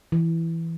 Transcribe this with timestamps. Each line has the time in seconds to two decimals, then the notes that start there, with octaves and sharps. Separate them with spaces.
0.12 E3